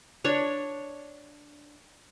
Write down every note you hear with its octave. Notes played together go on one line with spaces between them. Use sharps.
D4 C#5